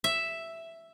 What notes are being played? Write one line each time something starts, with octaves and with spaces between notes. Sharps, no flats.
E5